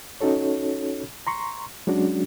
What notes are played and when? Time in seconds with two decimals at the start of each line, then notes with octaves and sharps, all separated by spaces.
0.21 C#4 D#4 F#4 A4 C#5
1.27 A#5 C6 C#6
1.87 F#3 G#3 C#4 D4 F#4